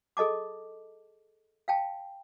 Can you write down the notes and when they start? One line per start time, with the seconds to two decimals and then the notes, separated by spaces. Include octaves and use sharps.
0.17 G#4 A4 D#5 A5 D6
1.68 F5 G5 A5